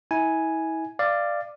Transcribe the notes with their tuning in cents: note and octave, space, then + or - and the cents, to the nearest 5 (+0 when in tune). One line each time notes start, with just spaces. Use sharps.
E4 -35 G#5 +0
D5 +10 F5 -15